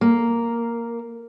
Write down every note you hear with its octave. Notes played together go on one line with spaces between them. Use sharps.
A#3